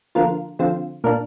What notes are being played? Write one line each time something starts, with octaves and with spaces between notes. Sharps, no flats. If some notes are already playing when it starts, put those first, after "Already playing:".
D3 F3 A#3 F4 A#4
D3 F3 C4 F4
A#2 A#3 D4 A#4